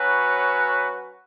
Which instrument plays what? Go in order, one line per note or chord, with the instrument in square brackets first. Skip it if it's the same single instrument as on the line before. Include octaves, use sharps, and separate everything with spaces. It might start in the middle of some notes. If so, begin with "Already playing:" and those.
Already playing: [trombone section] F#3 C#4 F#4 B4